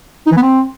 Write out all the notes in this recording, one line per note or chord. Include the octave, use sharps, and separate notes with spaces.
D#4
E3
B3
C4